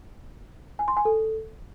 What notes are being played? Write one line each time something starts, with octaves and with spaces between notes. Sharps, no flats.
G#5
C6
G#5
A4